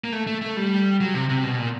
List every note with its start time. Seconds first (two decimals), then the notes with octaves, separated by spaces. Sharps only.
0.04 A#3
0.12 A3
0.27 A3
0.41 A3
0.57 G3
1.01 F#3
1.14 C3
1.29 C3
1.44 B2
1.58 A#2